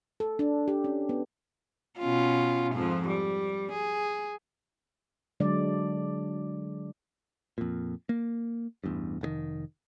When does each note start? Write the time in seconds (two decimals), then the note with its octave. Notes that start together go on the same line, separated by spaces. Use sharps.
0.20 A4
0.39 D4
0.68 G4
0.84 C#4
1.09 B3
1.99 B2 C#4 F4
2.73 F2 G#2 F3
3.08 G3
3.72 G#4
5.40 D3 F#3 G#3 D4 D5
7.58 F2 A#2
8.09 A#3
8.84 A1 E2 G2
9.21 F1 G#2 D#3